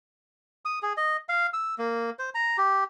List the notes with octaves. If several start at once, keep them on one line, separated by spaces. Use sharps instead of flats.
D#6
G#4
D#5
F5
E6
A#3
C5
A#5
G4